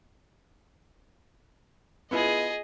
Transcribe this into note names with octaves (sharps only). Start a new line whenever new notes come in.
B3 E4 F4 G#4 D#5